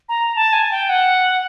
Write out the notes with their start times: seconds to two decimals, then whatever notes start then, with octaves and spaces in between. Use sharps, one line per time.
0.09 A#5
0.36 A5
0.53 G#5
0.71 G5
0.89 F#5